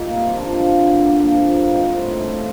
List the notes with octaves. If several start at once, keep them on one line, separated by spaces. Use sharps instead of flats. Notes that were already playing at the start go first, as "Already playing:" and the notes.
Already playing: G3 A#3 D#4 F4
C3
F3 D4
G2
D3
A#3
F3
G2
C4 D#4
A2
A3